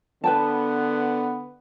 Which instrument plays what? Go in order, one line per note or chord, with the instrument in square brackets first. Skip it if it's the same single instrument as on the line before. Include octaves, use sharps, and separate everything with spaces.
[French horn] D3 [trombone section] B3 [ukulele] B4 G5 A5